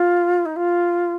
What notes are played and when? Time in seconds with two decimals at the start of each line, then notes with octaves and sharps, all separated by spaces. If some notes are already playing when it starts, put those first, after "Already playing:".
Already playing: F4
0.45 D#4
0.56 F4